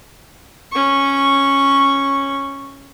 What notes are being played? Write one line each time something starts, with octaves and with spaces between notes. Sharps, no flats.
C#4 C#6